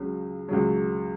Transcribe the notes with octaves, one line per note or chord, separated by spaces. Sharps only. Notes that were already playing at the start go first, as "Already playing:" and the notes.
Already playing: C#2 C#3 F#3
C#2 C#3 F#3